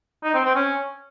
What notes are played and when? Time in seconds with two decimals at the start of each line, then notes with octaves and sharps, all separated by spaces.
0.24 D#4
0.34 C4
0.45 C4
0.55 C#4